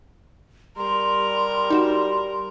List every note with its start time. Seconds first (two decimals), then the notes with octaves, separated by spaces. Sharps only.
0.77 G3 A#4 C6
1.70 D#4 F#4 E7